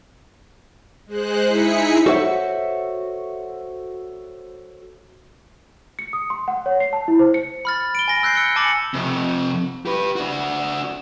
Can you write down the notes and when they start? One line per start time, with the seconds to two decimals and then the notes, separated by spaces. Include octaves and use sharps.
1.07 G#3 C5 F#6
1.46 D#4 E4 G#4 B6 C#7
2.06 F#4 A4 C5 C#5 E5 F#5
5.99 C#7
6.13 D#6
6.30 C6
6.48 F#5
6.66 C#5
6.80 C7
6.93 A5
7.08 E4
7.19 C5
7.34 C#7
7.65 B5 F6 A6
7.95 D7 G7
8.08 G#5 A#6
8.23 E6 F#6 G6 C7
8.35 E6 C#7 G7
8.56 G#5 A5 D6 A6 C#7 F#7
8.94 F2 C3
9.86 G4 B4
10.16 D4 F#4